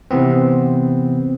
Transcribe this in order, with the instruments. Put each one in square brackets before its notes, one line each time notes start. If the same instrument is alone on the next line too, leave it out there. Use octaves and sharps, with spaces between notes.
[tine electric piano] C3 E3 B3 C4